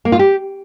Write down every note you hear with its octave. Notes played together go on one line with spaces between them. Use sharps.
A#3
F4
G4